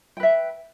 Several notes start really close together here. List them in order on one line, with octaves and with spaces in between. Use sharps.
G5 B4 E5